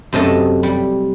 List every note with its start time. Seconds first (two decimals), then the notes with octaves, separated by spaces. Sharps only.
0.13 F#2 C3 A3 D#5 A5
0.63 G3